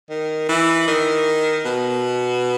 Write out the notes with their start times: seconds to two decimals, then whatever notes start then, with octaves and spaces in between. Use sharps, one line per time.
0.10 D#3
0.49 E3
0.88 D#3
1.65 B2